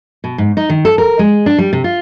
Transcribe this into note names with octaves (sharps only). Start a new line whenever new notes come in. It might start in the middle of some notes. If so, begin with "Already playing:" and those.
B2
G#2
D#4
D#3
A4
A#4
G#3
D4
G3
C3
F4